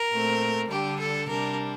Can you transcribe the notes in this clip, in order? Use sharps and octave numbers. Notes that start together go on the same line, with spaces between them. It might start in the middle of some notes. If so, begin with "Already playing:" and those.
Already playing: A#4
A#2 A3 C4
D3 G3 D4 G4
A4
C3 G3 D4 A#4